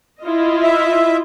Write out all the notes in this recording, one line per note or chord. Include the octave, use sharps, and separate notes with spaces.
E4 F4 D#5
E5